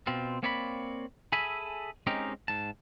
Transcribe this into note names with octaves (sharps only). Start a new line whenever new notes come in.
B2 C4 F4
A#3 C4 C#5 D5 E5 B5
G#4 A4 E5 G#5 B5
G#3 C4 C#4 D#4 G4 A#4
G#2 A5